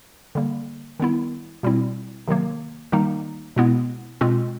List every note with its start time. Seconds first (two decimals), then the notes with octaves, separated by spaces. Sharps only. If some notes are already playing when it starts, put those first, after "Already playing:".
0.35 D3 G3 A#3
1.00 D#3 G3 B3 E4
1.63 B2 G3 C4 E4
2.28 C3 D#3 F#3 A#3
2.92 D#3 G3 A#3 D#4
3.56 B2 G#3 B3 E4
4.21 B2 G#3 C4 F4